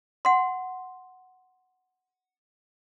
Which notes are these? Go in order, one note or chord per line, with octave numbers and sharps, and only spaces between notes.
F#5 C6